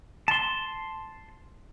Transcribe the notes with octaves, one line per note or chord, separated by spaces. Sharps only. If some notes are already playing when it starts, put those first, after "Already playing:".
A5 C6